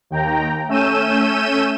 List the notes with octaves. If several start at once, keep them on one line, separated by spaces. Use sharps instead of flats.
D#2 G5 A#5
A3 C#4 E6 G6 D#7 E7